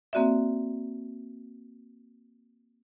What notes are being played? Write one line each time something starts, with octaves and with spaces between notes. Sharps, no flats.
A#3 C4 F#4 D5 E5